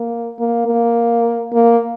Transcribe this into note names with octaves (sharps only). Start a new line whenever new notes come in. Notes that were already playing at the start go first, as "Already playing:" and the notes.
Already playing: A#3
A#3
A#3
A#3